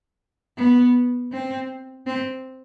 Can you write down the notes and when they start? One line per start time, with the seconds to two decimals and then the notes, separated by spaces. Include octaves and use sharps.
0.57 B3
1.32 C4
2.06 C4